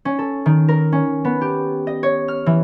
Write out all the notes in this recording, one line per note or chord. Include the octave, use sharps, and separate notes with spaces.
C#4
A4
D#3
A#4
C#4
B3
G4
D#5
C#5
F6
E3